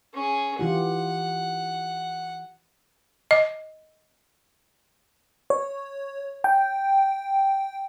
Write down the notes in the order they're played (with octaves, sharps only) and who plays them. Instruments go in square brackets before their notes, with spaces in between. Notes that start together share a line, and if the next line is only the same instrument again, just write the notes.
[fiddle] C#4 G#4
[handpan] E3 F4 G4 [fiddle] F#5
[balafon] D#5
[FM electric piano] C#5
G5